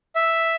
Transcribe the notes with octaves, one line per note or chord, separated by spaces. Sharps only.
E5